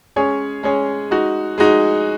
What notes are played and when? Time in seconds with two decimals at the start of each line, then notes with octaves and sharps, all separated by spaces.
0.16 G#3 C#4 G#4 C#5
0.63 G#3 C#4 G#4 C#5
1.10 G#3 D#4 F#4
1.58 G#3 D#4 F#4